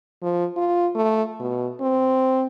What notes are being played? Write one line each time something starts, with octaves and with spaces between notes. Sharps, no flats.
F3
F4
A3
B2
C4